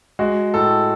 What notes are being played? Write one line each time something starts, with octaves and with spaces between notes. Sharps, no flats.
G#3 F#4
A2 A4